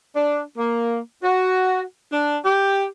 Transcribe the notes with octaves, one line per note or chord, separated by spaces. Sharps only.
D4
A#3
F#4
D4
G4